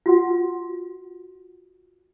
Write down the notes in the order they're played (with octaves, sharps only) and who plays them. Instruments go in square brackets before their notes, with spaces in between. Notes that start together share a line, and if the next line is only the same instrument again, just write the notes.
[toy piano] F4 F#4 F#5